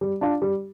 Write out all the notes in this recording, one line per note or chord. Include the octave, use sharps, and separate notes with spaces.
G3
D4 F4
G3